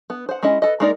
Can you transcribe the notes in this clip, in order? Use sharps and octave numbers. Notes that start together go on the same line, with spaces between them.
B3
C5 F#5
G#3 C#4 E4 D#5
A4 B4 D#5
G#3 A#3 D#4 A#4 D5